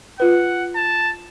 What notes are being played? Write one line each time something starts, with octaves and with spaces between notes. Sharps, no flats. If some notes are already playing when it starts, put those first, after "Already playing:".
F4 B4 F#5
A5